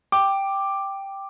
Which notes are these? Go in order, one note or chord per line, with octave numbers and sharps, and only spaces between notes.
G5 D6